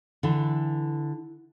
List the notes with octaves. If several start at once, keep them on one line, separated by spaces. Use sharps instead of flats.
D3 E3